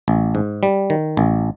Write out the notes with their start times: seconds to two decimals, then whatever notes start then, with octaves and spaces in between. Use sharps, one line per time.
0.08 A1
0.35 G#2
0.63 G3
0.90 D#3
1.17 A1